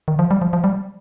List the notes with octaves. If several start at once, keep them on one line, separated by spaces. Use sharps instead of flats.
D#3
F3
G3
F3
F3
G3